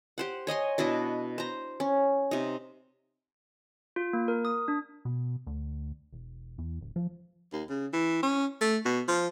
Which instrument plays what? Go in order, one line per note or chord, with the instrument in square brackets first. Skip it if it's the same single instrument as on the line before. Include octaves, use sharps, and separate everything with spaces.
[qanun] G4 C5 F#5
C#5 D#5 G#5 C6
B2 D4 E4 D#5
C5 A#5
C#4
C3 D#4
[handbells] F4
A#3
A#4
D#6
D4
[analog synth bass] B2
D2
E1
E2
D1
F3
[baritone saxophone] D#2
C#3
E3
C#4
A3
B2
F3